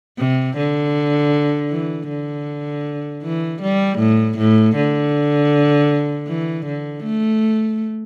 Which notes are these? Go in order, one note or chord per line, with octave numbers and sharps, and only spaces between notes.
C3
D3
E3
D3
E3
G3
A2
A2
D3
E3
D3
A3